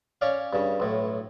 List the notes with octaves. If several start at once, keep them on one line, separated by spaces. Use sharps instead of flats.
C#4 C#5 D5 F5
G2 C#3
B1 A2